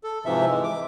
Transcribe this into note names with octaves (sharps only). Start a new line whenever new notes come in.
A4
G#2 C3 E3 F3 E5
E3 G#3
D6